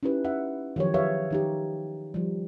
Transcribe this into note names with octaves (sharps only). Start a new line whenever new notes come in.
C#4 D#4 E4 G4 B4
E5 F#5
D#3 F3 F#3 G4 C#5
G4 G#4 B4 C#5 E5 F5
D#3 D#4 G4
F3 G3